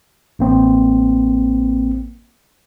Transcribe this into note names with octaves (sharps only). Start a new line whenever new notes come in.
A1 A#3 C4